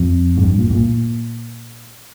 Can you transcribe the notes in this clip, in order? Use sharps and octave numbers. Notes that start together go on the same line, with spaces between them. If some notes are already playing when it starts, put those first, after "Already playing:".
Already playing: F2
G#2
G2
A#2
G#2
A#2